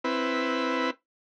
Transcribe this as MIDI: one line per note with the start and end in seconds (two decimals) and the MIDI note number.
0.04 0.90 60
0.04 0.90 64
0.04 0.90 71